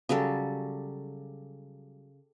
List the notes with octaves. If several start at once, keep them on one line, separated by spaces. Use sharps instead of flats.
C#3 F#3 G3 A4